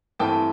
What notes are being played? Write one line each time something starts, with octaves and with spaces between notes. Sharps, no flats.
G2 E3 A3 C4 G5 A5